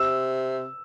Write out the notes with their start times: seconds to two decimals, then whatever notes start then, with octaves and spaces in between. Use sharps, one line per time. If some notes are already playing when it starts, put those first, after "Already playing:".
Already playing: C3 E6